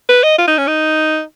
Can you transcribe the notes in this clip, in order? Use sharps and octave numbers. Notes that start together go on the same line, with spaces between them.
B4
D#5
F4
D#4
C#4
D#4